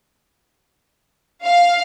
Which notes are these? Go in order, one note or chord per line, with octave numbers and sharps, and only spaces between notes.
F5